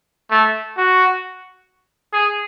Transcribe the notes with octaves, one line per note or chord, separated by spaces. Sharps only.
A3
F#4
G#4